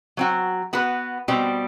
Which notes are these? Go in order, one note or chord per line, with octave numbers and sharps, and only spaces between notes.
F#3 C4 F#4
B3 F#4 B4
B2 G3 C4